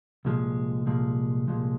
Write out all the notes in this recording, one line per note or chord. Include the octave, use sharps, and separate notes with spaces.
C2 A#2 F3 G#3
C2 A#2 F3 G#3
C2 A#2 F3 G#3